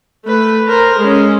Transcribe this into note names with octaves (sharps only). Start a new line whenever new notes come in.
A3 B4
A#4 C5
G#3 C#4